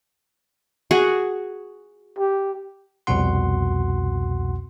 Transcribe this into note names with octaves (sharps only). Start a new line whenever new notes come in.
F#4 G#4
G4
C2 F2 B2 F#4 F#5 C6